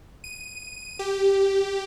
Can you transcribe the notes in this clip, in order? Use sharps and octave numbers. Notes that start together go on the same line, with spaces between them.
D#7
G4